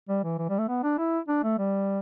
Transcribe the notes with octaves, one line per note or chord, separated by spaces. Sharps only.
G3
E3
E3
G3
A3
B3
D4
E4
D4
A3
G3